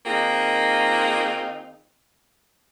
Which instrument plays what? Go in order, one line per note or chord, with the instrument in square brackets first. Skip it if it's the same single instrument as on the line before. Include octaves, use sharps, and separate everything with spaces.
[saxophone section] D#3 A#3 C4 D#4 F4 G#4